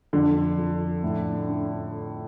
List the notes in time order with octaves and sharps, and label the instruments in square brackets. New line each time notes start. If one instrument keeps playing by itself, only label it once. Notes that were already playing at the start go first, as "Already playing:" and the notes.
[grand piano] F2 [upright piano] D3
[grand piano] F2
A2
D4